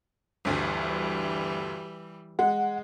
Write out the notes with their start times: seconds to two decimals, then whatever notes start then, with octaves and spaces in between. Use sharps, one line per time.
0.45 G1 D2 E3 G3
2.39 G#3 F#5